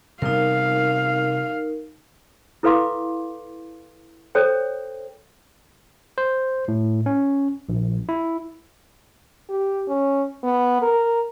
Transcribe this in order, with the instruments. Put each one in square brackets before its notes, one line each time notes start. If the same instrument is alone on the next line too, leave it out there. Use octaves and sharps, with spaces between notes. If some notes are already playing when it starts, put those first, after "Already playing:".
[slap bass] C3 G3 B3 [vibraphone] D#4 A#4 [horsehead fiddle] F5
[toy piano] E4 A4 B4 F5 C6 D6
A4 C5 C#5 G5
[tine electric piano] C5
A2
C#4
A#1
E4
[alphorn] G4
C#4
B3
A#4